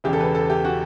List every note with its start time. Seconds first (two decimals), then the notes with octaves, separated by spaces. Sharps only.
0.04 E1 E2 C#3 G4
0.13 A4
0.20 B4
0.35 A4
0.50 G4
0.65 F#4